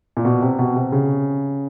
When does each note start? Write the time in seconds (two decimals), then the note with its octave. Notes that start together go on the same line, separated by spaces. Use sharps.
0.17 A#2
0.25 B2
0.42 C3
0.59 B2
0.76 C3
0.92 C#3